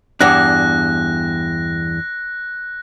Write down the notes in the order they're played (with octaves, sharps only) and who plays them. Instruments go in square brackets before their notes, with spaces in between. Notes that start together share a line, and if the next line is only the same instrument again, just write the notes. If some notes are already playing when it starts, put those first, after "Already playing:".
[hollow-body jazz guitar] E2 G2 D4 [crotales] F#6 A#6